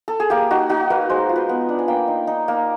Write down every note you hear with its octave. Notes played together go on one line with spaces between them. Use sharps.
A4
G#4
A#3 G4
D#4 F#4
D#4 F#4
A#3 B4
G#3 C5
F4
B4
B3
D4
G#5
A#3 G5
D#4
D#4
A#3